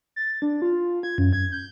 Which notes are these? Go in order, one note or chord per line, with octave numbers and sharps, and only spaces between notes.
A6
D4
F4
G#6
F#2
G#6
G6